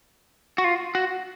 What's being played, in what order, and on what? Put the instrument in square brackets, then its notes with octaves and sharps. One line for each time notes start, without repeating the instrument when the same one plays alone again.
[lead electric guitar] F#4
F4
F#4